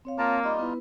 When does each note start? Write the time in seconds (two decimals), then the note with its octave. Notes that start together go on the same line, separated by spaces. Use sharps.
0.05 C4 C#5 F5
0.18 A#3 F4 A5 A#5
0.44 G3 D#4 F4 D#5 D6
0.59 B3 E4 B4